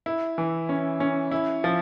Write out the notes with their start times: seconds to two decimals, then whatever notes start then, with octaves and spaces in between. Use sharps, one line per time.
0.06 E4
0.38 E3
0.69 C#4
1.00 C#4
1.31 E4
1.64 F3